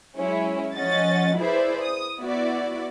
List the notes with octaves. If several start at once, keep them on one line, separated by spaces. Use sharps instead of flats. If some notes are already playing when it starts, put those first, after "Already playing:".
F#3 G#3 C#4 E4
F3 C#4 D#5 F#5 A6
E4 G#4 B4 C5 D5 E5
D#6
B3 E4 F#4 D5